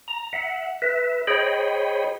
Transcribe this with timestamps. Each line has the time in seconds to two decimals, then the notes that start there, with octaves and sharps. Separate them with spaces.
0.08 A#5
0.33 E5 F#5
0.82 B4 E5
1.27 G#4 C5 C#5 D#5 G5 B5